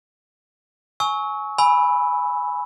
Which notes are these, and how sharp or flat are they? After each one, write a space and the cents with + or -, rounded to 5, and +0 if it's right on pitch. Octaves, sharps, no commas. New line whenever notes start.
G#5 +20 C#6 +0 E6 -35
G#5 +0 B5 +0 E6 +0